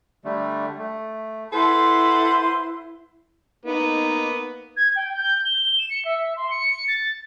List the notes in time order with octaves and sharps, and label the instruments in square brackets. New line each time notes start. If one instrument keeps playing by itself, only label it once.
[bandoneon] D3 G3 A3
A3
[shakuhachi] E4 [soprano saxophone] A4 [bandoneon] B4 C5 [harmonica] F#5 C6
[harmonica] A#3 B3 [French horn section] D#4
[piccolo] G#6
G5
G6
G7
E7
C#7
E5
C6
C#7
A6